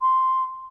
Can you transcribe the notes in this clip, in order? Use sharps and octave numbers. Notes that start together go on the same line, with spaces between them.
C6